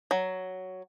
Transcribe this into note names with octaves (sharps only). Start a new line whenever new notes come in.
F#3